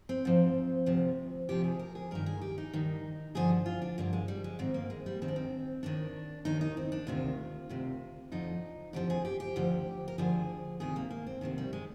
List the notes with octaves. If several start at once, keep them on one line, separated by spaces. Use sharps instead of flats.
C4
G#2 F3
D2 C3 F3
D2 C3 F3 G4
G#4
A#4
G#4
G2 D#3 A#4
G#4
G4
D#4
G2 D#3
G2 D3 F3 G#4
F4
D4
G2 D3 F3 A#3
G#3
G3
G#3
G#2 D#3 C4
A#3
G#3
G3
G#2 D#3 C4
D4
C4
D#2 D#3 D4
D#2 D#3 D#4
D#4
C4
D4
D2 C3 D#3 F4
D2 C3 D#3
F2 D3 F3 D#4
F2 D3 F3 G4
G#4
G4
G4
D2 D3 F3
A#4
D2 D3 F3 G#4
D2 C3 D#3 G#4
A#3
A#3
C4
D2 C3 D#3 D4
G3
G#3